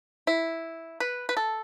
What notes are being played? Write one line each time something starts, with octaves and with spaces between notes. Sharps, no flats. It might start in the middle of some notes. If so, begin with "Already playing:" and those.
E4
B4
B4
A4